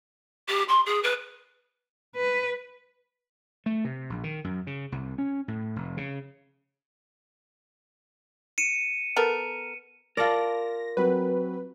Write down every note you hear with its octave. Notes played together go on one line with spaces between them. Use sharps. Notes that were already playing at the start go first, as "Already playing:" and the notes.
G4
C6
G#4
B4
B4
A3
C3
A#1
D#3
F#2
C#3
C2
C#4
A2
F1
C#3
C#7 D#7 E7
B3 A4 A#4
F4 A#4 D5 A5 A#6
F#3 C4 B4